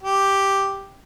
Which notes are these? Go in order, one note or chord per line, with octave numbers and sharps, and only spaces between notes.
G4